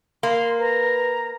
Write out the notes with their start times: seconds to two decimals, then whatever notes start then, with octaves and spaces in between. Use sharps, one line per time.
0.23 A#3 C6
0.60 B4 A#5